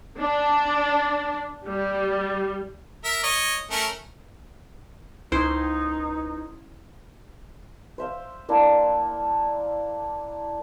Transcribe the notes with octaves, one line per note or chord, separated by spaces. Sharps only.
D4
G3
A#4 E5
C#5 D#5
A3 C#4 A#4
C#2 C#4 D#4 E4 C5
C5 E5 F5
A#3 D4 E4